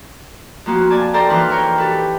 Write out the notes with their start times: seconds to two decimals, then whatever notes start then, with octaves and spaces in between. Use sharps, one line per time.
0.66 F2 A#3 F4 F#4
0.90 D5 G#5 A5
1.13 A4 A#4 C5 D5 G5 A#5
1.30 E3 D#4 B4 C6 F6
1.50 A#4 C#5 G5
1.78 G4 A4 B4